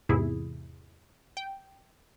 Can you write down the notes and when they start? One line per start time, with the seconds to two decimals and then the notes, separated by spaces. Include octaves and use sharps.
0.09 E2 G#2 C3 E4 G#4
1.37 G5